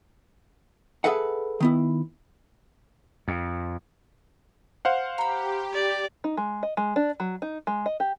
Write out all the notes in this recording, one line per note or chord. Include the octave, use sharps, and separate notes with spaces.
G#4 A4 B4 E5 F#5
D#3 B3 E4
F2
C5 F5 F#5
G4 A#5 B5
D5
D#4
G#3
D#5
G#3
D4
F#3
D#4
G#3
D#5
G4